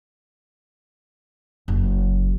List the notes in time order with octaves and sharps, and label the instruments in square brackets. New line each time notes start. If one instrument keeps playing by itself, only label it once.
[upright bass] F#1